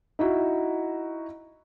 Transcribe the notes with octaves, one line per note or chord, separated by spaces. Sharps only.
D#4 E4 F#4